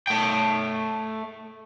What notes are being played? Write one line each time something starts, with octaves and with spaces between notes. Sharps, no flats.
A3 G5